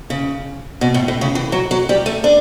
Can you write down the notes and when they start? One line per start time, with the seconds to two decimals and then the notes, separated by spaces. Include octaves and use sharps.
0.10 C#3
0.81 B2
0.94 A2
1.08 A2
1.21 C#3
1.35 E3
1.52 F#3
1.71 F#3
1.89 G3
2.06 A3
2.24 D4